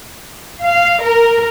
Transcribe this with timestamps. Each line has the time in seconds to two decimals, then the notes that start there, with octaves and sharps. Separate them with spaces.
0.62 F5
1.02 A#4